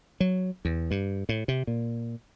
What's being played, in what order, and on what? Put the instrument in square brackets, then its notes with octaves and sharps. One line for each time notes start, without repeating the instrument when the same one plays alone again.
[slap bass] F#3
E2
G2
A2
C3
A#2